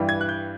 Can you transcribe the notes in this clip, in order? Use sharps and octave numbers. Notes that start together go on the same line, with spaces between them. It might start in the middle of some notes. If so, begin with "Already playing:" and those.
Already playing: G2 E3 G3
G#6
F#6
G6